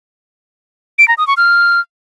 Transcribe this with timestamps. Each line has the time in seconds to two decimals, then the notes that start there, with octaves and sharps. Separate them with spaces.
0.98 D7
1.08 A#5
1.18 D#6
1.27 C#6
1.37 F6